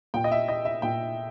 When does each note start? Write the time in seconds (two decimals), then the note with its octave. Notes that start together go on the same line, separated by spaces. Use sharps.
0.14 A#2 G5
0.24 D#5
0.31 E5
0.48 D#5
0.65 E5
0.82 A#2 G5